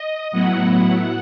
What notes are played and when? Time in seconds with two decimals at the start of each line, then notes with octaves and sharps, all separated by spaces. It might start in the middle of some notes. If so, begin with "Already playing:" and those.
Already playing: D#5
0.31 A2 F#3 B3 E4 F#5